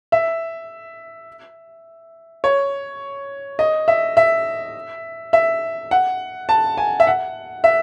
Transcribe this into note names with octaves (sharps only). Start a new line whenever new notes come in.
E5
C#5
D#5
E5
E5
E5
F#5
A5
G#5
E5
F#5
E5